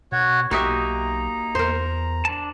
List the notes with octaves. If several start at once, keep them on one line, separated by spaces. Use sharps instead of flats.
B2 F#4 C#5
B1 A#3 D#4 F#4 G4 E5 A#5 D#6
E2 A#4 C5
D4 A5